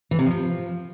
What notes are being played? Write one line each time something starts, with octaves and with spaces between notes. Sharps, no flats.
E3
C3
F3